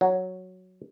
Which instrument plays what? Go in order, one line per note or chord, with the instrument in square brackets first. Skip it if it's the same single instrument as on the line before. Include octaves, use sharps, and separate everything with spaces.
[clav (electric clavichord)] F#3